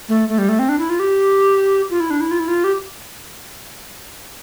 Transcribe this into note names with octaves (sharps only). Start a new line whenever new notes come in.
A3
A3
G3
A3
C4
D4
E4
F4
G4
F4
E4
D4
E4
F4
E4
F4
G4